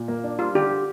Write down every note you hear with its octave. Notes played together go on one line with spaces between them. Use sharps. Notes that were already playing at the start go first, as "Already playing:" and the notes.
Already playing: A#2
A#3
D4
G3 F4
D3 G4
G4